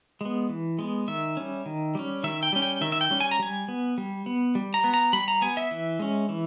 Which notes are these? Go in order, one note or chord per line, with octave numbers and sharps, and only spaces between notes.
G#3 B3
E3
G#3 B3
D#3 E5
G3 C#4
D#3
G3 C#4
D#3 E5
G5
G3 C#4
G5
D#3 E5
E5
G5
G3 C#4
G#5
A#5
G3 G#5
B3
G3
B3
G3
A#5
B3
A#5
G3 B5
A#5
B3 G#5
E5
E3
G#3 C#4
E3